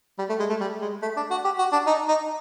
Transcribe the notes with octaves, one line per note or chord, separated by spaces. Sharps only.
G3
A3
G#3
A3
G3
G#3
A3
D4
F#4
G4
F#4
D4
D#4
D#4